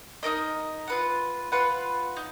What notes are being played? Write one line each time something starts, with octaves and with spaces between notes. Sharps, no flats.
D#4 F#4 A#4 D#5
F4 B4 F#5
F4 B4 F#5
D#4